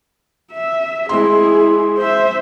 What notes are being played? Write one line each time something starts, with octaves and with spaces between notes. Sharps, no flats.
E5
G#3 C4 E4 G#4 C6
C5 E5